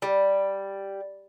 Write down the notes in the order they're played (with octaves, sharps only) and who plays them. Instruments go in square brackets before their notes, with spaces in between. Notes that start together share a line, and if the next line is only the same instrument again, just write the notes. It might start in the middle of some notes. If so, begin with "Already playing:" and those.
[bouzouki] G3